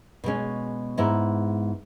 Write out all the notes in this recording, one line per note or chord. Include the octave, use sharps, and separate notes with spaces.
B2 G#3 C#4
G#2 G#3 B3 E4